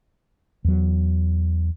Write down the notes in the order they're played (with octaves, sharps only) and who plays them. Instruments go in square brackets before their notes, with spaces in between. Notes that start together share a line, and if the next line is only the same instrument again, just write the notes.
[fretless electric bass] E2 F#3